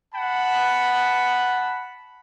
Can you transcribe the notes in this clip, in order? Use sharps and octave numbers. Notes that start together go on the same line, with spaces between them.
F#5 A5 B5